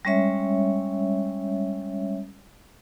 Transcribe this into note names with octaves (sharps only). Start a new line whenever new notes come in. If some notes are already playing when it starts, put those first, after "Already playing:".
G3 G#3 C#4 C#5 E5